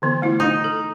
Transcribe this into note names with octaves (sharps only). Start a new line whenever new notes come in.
D3 E3 B3
A3 E4 F4
D#4
A4